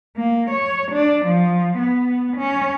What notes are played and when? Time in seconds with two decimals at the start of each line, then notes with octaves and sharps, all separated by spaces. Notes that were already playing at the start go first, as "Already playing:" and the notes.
0.17 A#3
0.51 C#5
0.92 D4
1.26 F3
1.78 B3
2.37 C#4